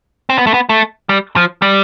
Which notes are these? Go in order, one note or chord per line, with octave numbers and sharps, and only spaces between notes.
C4
B3
A3
B3
A3
G3
F3
G3